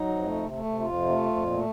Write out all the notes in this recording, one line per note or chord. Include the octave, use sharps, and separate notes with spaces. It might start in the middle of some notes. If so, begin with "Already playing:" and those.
Already playing: F#3 D#4
F2
A3
C3
A3
C3
F2 F4
C3
A3
F2
A#2
A3